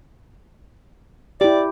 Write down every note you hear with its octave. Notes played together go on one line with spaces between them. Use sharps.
E4 G4 D5